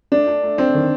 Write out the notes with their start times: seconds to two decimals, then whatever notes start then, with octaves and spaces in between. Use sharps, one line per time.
0.12 A3 D4
0.27 D4
0.43 A3
0.58 C4 D4
0.74 D#3